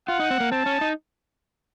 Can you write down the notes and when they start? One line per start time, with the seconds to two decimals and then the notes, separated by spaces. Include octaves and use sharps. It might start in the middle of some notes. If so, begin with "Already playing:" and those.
0.08 F4 F#5
0.19 D#4
0.31 C4
0.40 A#3
0.52 C4 A5
0.66 C#4
0.81 D#4